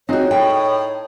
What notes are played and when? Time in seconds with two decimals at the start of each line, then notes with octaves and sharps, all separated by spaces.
0.09 C4 D#4 F#4 G#4 C#5 D#5
0.31 A2 G5